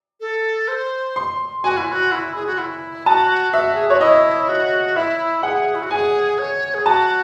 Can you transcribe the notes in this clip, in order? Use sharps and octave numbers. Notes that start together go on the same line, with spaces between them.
A4
C5
C6
F#4 G#5
E4
F#4
E4
G#4
F#4
E4
F#4 A5
F#4 E5
G#4
F#4 C#5
E4 D#5
F#4
E4 E5
G#4 F#5
E4
F#4
G#4 G#5
C#5
G#4
F#4 A5